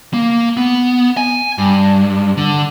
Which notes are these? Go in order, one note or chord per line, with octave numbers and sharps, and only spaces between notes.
A#3
B3
G#5
G2
D3